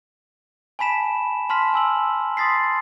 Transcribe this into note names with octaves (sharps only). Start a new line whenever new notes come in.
G#5 A5 B5 B6 E7
A5 C6 F6 B6
G#5 E6 F#7
C6 D#6 A6 B6 C7